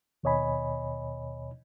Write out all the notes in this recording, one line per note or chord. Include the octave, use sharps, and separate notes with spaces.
D#2 B2 C#5 D#5 G#5 B5